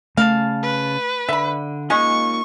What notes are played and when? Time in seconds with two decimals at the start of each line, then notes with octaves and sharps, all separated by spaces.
0.17 C#3 A3 F5 A5
0.63 B4
1.29 D3 E5 B5
1.90 G#3 A#3 C#4 D#4 F4 C#6